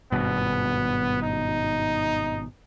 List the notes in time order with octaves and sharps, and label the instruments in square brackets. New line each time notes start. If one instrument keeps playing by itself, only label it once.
[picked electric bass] G#1 G2 B2 [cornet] B3
[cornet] D#4